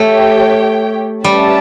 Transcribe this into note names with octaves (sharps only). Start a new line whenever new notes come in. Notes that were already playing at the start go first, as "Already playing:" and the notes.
Already playing: A3 G4 C#5 G5
G3 C#4 G4 B4 E5 A5